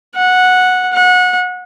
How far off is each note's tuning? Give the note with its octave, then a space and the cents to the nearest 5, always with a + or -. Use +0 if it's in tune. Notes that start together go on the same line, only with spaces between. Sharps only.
F#5 -10
F#5 -25